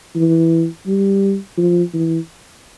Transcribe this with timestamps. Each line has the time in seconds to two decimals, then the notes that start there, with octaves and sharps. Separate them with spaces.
0.16 E3
0.87 G3
1.58 F3
1.94 E3